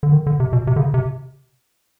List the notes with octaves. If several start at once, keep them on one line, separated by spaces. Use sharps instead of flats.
D3
D#3
D3
C3
B2
C3
D3
C#3
C3